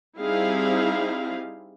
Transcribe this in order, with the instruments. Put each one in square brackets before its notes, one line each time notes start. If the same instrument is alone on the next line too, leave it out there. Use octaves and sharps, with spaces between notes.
[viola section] G3 C4 D#4 E4 G#4 F5